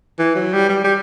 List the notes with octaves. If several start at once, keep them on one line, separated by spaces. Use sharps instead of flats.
E3
F#3
G3
G3
G3